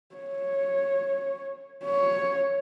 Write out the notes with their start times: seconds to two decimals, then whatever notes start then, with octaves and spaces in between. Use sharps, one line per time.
0.15 C#5
1.84 C#5